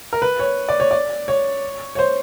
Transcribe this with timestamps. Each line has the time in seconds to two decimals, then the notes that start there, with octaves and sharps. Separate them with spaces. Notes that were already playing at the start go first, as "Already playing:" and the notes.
0.13 A#4
0.22 B4
0.39 C#5
0.69 D5
0.80 C#5
0.91 D5
1.28 C#5
1.95 C#5
1.99 C5